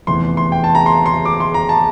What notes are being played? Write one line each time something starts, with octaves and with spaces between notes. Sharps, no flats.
F1 E2 E3 C6
C6
G5
A5
A#5
C6
C6
D6
C6
A#5
A5